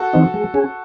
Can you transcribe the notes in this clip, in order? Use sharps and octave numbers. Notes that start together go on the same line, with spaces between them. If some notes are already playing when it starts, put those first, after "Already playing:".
Already playing: F#4 A4
E3 C4 D#4
G#3
C#4 G#4